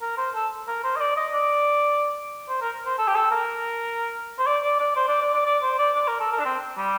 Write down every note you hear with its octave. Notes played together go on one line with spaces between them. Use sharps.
A#4
C5
A4
A#4
C5
D#5
D5
D#5
D5
C5
A#4
C5
A4
G4
A4
A#4
C5
D5
D5
D5
C5
D5
D5
D5
D5
C5
D5
D5
A#4
A4
A#4
D4
C4
G3